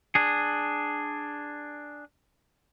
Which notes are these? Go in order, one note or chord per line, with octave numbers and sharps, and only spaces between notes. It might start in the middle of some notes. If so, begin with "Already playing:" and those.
D4 G#4